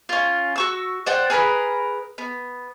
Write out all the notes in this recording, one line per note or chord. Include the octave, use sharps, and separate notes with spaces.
C#4 F4
F#4 C#6 E6
C5 D5 F#5 G5
G#4 A#4 B4 B5
B3